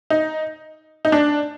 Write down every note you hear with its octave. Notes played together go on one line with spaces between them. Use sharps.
D#4
D#4
D4